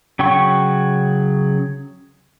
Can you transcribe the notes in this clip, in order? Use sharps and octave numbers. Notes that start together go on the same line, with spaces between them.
C#3 F#3 G5 C#6